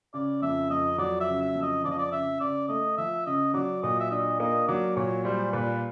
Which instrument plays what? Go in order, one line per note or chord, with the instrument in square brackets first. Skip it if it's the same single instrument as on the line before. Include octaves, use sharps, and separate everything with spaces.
[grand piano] C#3 [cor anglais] D5
[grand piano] F2 [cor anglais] E5
[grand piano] F2 [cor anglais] D#5
[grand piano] F#3 [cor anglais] D5
[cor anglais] E5
[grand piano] C#3
[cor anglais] E5
[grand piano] F2
[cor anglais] D#5
[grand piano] F3 [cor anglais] D5
[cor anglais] D#5
D5
[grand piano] C#3 [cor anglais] E5
[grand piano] C#3 [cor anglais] D5
[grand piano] A3 [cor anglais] D#5
[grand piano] F3 [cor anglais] E5
[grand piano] C#3 [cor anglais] D#5
[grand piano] F#3 [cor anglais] D5
[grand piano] A#2 [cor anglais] D#5
[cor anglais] E5
[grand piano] D4 [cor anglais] D#5
[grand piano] A#3 [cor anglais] D#5
[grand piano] F#3 [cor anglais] D5
[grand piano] A#2 [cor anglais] C#5
[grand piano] G3 [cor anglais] C5
[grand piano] A#2 [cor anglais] B4